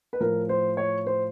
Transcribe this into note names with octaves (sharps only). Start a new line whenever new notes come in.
B4
A2 F3 A#4
C5
C#5
C5